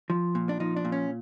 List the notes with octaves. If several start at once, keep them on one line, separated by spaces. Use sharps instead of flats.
F3
A#2
D4
F3 D#4
D4
A#2
C#4